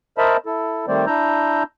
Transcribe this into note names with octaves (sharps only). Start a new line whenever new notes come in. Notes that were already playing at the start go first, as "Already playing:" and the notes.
A#4 C5 D#5 E5 A5 B5
E4 A4
D#3 G3 A3 C4 C5 D5
D4 E4 A#5 E6 G6